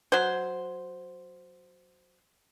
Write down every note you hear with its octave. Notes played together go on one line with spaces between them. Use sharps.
F#3 C5